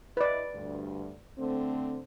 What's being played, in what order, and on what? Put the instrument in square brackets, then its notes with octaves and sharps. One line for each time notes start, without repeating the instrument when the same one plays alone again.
[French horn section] E4 D#5 [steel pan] B4 D5
[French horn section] D2 G2
D3 A3 C4